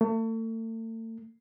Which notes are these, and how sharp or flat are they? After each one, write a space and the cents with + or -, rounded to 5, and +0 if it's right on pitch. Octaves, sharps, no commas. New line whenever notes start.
A3 +40